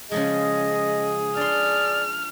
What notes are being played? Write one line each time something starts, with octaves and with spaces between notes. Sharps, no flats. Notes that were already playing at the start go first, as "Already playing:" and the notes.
C#3 F3 G#3 G#4 D#5
D4 D5 C6 F6